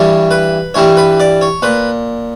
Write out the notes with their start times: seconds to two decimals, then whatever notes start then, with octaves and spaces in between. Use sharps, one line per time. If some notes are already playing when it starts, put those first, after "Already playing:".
Already playing: G2 E3 G3 C#5
0.31 B4
0.74 G2 E3 G3 C#5
0.97 B4
1.20 D5
1.41 C#5
1.62 A#2 B4